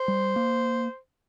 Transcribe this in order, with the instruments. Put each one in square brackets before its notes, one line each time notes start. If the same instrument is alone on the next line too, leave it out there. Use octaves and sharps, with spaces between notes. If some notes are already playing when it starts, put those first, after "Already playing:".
Already playing: [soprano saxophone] C5
[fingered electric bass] G3
A#3